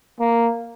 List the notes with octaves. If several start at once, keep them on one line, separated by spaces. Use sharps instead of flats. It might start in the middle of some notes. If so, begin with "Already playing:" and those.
A#3